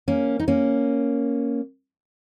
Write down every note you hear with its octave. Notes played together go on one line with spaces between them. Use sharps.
A#3 C#4
D#4
A#3 C#4